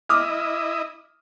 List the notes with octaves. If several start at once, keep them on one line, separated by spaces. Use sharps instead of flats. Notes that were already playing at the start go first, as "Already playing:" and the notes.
E4 D#5 D6 D#6 F6